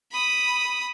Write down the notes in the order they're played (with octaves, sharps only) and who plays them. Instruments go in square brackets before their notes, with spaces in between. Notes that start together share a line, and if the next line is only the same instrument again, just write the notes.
[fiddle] B5 D#6